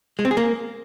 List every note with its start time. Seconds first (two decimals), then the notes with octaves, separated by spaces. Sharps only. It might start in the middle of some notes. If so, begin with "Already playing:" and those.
0.19 G#3
0.25 C4
0.31 G#4
0.37 A#3